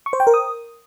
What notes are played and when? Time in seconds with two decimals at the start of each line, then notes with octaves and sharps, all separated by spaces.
0.06 C#6
0.13 C5
0.20 G5
0.27 A#4
0.34 D#6